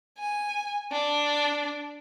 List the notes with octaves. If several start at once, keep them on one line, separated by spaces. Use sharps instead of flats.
G#5
D4